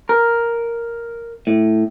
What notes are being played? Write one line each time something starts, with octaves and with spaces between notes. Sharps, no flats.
A#4
A2